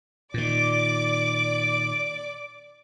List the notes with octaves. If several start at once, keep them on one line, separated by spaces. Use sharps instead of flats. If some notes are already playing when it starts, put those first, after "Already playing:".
A#2 D#3 D5 D6